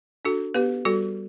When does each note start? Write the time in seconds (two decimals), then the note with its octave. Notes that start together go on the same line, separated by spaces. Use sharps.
0.25 D4 F#4 A4
0.54 B3 G4 B4
0.85 G3 F#4 A4